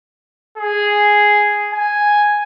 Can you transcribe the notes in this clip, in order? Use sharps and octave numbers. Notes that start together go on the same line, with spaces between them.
G#4
G#5